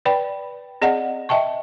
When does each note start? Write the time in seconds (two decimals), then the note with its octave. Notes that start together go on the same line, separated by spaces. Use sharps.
0.05 B4 D5 G5 B5
0.82 C4 G#4 D5 D#5 F#5
1.29 D#5 E5 G5 A5 C#6